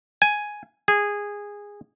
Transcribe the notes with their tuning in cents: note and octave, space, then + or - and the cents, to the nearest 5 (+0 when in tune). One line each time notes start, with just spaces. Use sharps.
G#5 +5
G#4 -15